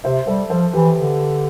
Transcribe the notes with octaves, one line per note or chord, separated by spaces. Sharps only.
C3 C5 E5
G3 A4 C5
F3 A4 C5
E3 G4 B4
D3